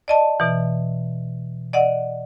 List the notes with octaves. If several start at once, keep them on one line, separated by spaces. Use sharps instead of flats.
D5 D#5 A5
B2 E3
D5 D#5 F#5